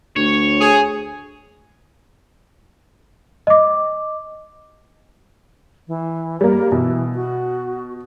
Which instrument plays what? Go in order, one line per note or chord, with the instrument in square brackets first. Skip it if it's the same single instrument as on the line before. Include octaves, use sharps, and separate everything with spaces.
[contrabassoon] D2 [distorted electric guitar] C#5
[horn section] G#4
[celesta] D#5 D6
[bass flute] E3
[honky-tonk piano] G3 A#3 [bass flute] A#4
[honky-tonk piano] B2 [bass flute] E3
[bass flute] F#4